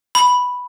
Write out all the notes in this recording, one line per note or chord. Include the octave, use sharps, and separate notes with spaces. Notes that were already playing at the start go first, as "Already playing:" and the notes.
B5